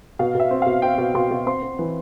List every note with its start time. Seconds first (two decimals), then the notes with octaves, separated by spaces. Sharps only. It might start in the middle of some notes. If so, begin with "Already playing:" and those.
0.19 B2 F5
0.35 B2 E5
0.51 C4
0.62 B2 F5
0.82 C4 G5
0.98 B2
1.14 B2 C6
1.31 B2
1.46 C4 C6
1.62 C4
1.79 E3